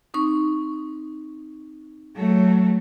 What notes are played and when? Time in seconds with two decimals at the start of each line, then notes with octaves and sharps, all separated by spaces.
0.14 C4 D#4 C#6
2.17 F#3 A3